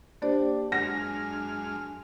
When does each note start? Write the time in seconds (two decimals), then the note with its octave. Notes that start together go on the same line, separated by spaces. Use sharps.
0.22 A#3 D4 G4 C5 D5
0.72 F#2 G#3 D4 F#5 F6 A#6